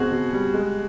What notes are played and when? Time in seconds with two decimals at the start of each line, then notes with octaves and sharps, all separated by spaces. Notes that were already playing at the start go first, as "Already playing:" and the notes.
Already playing: B2 C4 F#4 G#4
0.11 B2
0.33 G3
0.54 G#3